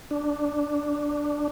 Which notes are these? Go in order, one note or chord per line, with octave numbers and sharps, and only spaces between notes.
D4